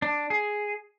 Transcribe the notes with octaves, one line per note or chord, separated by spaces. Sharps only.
D4
G#4